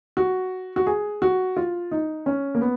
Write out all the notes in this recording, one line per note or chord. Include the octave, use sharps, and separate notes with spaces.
F#4
F#4
G#4
F#4
F4
D#4
C#4
A#3
B3